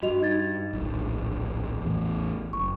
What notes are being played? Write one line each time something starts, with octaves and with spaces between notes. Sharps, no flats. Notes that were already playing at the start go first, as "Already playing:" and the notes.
G2 F#4 D#5 F7
D#4 G#6 A6
D1 A#1
A1 E2 A2
F#1 C#6